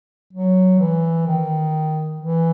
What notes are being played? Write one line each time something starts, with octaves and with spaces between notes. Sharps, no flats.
F#3
E3
D#3
E3